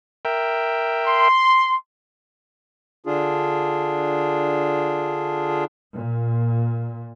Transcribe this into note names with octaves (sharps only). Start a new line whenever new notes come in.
A#4 E5 G5
C6
D3 D4 F4 G#4
A#2